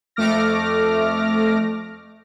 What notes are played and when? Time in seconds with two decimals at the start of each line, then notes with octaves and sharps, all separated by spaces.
0.16 F2 A3 D6 F6 A#6